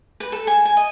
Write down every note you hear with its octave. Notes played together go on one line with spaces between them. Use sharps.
B4
A4
G#5
G#5
D#5